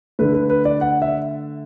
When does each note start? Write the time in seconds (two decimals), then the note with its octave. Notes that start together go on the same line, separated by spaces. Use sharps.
0.19 D3 A3 B4
0.34 B4
0.50 B4
0.65 D5
0.81 F#5
1.02 E5